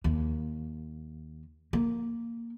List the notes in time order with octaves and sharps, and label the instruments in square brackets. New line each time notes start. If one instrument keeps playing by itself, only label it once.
[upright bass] D#2
A#3